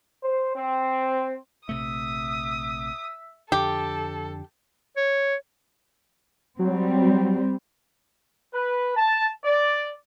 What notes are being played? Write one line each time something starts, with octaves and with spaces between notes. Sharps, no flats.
C5
C4
A#1 C3 A3 E5 D#6
F2 D3 G4 A4
C#5
F#3 G3 C4
B4
A5
D5